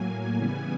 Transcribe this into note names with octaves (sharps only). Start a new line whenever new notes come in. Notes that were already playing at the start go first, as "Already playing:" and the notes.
Already playing: A2 F#3 A#3 G#5
C#3 E3 G3 B3 G#5